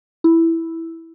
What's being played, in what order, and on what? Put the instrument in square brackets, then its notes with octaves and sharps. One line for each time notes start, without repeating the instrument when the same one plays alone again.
[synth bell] E4